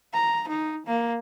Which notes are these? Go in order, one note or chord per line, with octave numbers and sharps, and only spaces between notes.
A#5
D#4
A#3